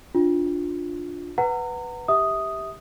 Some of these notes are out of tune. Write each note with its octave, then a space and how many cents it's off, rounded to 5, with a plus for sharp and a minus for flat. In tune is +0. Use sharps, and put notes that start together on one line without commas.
D4 +0 F4 +15
B4 +0 F#5 +0 A#5 -30
G4 +0 E5 -25 D#6 +0